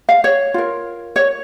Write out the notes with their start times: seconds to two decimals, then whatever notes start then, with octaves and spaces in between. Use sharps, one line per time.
0.09 F5
0.24 C#5
0.54 F4 A#4
1.16 C#5